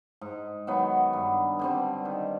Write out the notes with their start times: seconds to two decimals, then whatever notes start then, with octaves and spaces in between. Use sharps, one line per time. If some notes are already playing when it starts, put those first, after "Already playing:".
0.21 G#2
0.67 D#3 F#3 B3
1.13 G2
1.59 D3 G3 C4
2.05 D#3